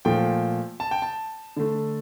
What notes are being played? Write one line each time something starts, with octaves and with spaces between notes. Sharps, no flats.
A#2 F3 A3 G5
A5
G5
A5
D3 A3